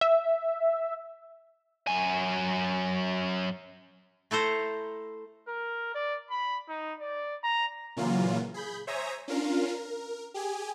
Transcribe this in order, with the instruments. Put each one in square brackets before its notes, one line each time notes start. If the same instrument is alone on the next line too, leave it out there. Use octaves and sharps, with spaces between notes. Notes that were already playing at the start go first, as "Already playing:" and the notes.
[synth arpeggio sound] E5
[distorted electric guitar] F#2 G#5
[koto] A3 E4 A4 C5 A#5
[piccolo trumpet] A#4
D5
B5
D#4
D5
A#5
[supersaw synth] A#2 C#3 E3 F#3 A#3 F4
G#4 B5 G6
C5 C#5 E5 G#5 A#5 D#6
C#4 D4 F4 A#4 F5
A#4
G4 G#4 G#5